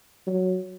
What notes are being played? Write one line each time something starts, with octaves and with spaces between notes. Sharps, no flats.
F#3